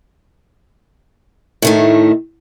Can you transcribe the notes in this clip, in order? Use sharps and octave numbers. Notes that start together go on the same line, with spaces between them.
A2 D#3 A3